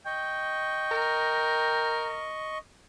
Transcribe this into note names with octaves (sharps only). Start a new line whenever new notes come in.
D#5 G5 C#6
A#4